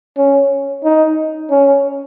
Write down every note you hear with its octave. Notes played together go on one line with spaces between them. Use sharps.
C#4
D#4
C#4